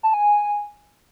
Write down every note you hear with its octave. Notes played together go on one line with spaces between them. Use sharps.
A5
G#5